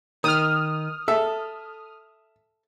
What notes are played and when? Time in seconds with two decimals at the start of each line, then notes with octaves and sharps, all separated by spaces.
0.24 D#3 D#6 F6
1.08 A4 E5